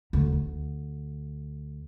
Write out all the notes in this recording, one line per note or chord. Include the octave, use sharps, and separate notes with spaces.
D2
D2